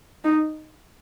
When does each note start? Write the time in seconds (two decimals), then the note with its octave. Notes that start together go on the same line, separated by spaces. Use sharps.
0.24 D#4